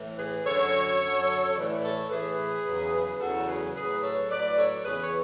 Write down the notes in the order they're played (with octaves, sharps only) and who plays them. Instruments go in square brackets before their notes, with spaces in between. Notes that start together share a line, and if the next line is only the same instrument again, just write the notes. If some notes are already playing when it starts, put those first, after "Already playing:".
Already playing: [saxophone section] A2 E3
G#4 B4
F#2 D3 F#3 A4 C#5
F#2 D3 F#3
A2 E3 B4 D5
A4 C#5
A2 E3 G#4 B4
E2 C#3 F#3
E2 C#3 F#3 F#4 A4
G#4 B4
A2 F#3 G#4 B4
A4 C#5
A2 F#3 B4 D5
A4 C#5
E2 C#3 E3 G#4 B4
C#5